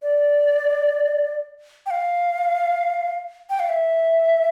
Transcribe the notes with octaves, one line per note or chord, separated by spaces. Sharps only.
D5
G5
F5
G5
F5
E5